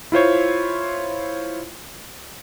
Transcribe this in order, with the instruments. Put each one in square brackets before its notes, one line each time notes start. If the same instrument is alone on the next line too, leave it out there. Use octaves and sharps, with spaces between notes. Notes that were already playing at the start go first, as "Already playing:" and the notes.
[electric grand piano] E4 F4 C5 C#5